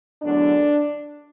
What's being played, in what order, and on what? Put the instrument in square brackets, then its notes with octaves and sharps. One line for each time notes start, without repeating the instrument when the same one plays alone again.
[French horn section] E2 D3 F#3 A3 D4